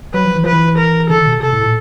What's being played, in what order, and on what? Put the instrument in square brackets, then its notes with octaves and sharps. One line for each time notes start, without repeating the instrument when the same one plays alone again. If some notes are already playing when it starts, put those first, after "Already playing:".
[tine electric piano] F#3 [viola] B4
[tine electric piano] F3
E3
[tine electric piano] F3 [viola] B4
[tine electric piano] E3
[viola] A#4
[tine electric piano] D3 [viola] A4
[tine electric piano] D#3
B2
[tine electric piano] C3 [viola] A4
[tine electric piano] A2
A#2